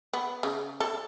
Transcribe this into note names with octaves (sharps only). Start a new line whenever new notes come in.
B3
C#3
A4